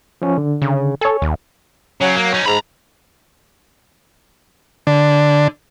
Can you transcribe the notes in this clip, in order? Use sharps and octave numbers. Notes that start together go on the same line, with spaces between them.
F3 C#4
D3
C#3
A4 C#5 G#5
D#2
C#3 F#3
A#3
C#4 D#4
G#2 A#5 B5
D3